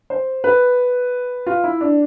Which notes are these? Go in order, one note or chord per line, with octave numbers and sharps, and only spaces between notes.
C5
B4
F4
E4
D4